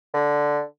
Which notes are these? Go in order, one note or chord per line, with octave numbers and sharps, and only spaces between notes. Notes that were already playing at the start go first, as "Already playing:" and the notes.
D3